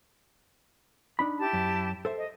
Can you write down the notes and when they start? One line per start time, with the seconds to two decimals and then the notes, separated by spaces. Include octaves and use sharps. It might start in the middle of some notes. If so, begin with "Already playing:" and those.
1.19 D4 D#4 B5
1.40 E4 G4 A5
1.53 F#2
2.05 A4 C5 E5
2.18 D#5